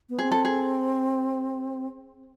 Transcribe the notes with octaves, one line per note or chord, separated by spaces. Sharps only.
B3
C4 G#4
A4
G#4